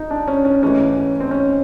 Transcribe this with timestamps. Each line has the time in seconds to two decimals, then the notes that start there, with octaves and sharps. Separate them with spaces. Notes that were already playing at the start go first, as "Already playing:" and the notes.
Already playing: D#4
0.10 D4
0.27 C#4
0.45 C#4
0.62 G#2 E3 A3 C#4
1.20 C4
1.31 C#4